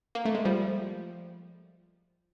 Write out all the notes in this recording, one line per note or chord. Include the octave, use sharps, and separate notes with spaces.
A#3
A3
G#3
F3 G3